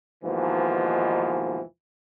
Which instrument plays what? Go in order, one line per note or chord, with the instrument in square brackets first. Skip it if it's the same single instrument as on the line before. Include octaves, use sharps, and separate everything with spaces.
[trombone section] D#2 G#2 B2 E3 F3